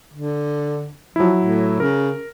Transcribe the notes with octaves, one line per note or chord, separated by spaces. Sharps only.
D3
F3 F#3 E4
A2
C#3 A#4